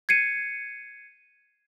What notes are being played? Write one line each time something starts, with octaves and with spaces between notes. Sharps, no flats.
G#6 C7 C#7 D#7